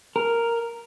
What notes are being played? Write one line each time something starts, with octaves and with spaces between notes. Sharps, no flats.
A#4